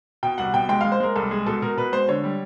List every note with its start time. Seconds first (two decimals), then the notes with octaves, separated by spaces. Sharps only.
0.23 B2 G5
0.38 C2 F#5
0.53 B2 G5
0.69 G#3 G5
0.81 G#3 F5
0.92 C5
1.00 G#3 A#4
1.16 C2 A4
1.31 G#3 G#4
1.46 B2 A4
1.62 B2 A#4
1.77 B2 B4
1.93 G#3 C5
2.08 D3 C#5
2.24 G3